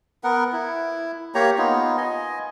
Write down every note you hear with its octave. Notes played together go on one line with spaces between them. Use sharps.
B3 A#4 F#5
E4
A#3 G4 C#5 A#5
B3 D#4 F4
D#5 G#5